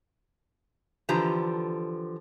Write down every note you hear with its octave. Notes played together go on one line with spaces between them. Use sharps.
D3 E3 F3 G4 A#5